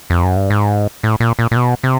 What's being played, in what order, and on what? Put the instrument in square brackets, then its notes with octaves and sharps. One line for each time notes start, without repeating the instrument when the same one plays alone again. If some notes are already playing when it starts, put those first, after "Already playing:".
[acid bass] F2
F#2
G2
G#2
A2
A#2
A#2
A#2
B2
C3